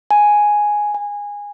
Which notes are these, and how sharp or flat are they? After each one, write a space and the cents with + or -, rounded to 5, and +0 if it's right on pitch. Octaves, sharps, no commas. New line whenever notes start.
G#5 +0
G#5 -15